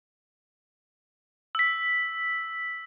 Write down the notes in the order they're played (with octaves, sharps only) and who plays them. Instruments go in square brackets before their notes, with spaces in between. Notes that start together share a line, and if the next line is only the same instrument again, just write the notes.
[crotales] E6 B6